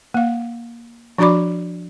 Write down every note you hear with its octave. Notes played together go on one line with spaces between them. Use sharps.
A#3 F5
F3 D4 F#4 D5 B5 D6